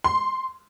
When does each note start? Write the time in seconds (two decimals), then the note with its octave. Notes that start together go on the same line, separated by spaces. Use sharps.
0.04 C6